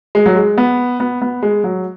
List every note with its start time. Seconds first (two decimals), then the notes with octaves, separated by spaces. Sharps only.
0.15 G#3
0.26 F#3
0.36 G#3
0.58 B3
1.00 B3
1.22 B3
1.43 G#3
1.64 F#3